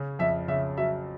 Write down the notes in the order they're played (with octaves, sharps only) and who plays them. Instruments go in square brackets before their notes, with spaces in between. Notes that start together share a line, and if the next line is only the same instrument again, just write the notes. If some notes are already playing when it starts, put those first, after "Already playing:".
Already playing: [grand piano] C#3 C#4
[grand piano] F2 [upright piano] E5
[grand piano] C#3 [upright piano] E5
[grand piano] F#3 [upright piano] E5